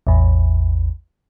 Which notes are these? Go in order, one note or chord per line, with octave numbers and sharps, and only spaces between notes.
A1 E2